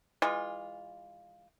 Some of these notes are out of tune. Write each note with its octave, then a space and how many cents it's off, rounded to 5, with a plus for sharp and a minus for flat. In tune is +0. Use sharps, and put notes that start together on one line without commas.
E3 +0 G#3 -30 F4 +0